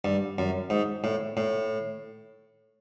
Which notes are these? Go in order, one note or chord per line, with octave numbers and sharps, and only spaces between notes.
G2
F#2
G#2
A2
A2